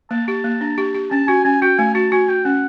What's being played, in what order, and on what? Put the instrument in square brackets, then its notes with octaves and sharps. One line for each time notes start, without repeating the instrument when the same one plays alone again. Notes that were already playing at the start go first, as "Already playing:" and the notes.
[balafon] A#3 [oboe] A5
[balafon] G4 [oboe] A5
[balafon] A#3
D4
G4
G4
[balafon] C#4 [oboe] A5
[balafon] F#4 [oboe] G#5
[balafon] C#4 [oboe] G#5
[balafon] F#4 [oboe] G5
[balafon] A3 [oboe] G#5
[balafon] F#4 [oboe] A5
[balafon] F#4 [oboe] G#5
[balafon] F#4 [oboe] G5
[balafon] C#4 [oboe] F#5